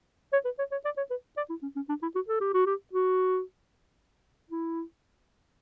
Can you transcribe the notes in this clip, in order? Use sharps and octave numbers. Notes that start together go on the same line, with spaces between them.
C#5
B4
C#5
C#5
D5
C#5
B4
D5
E4
C#4
C#4
D4
E4
F#4
A4
G4
F#4
G4
F#4
E4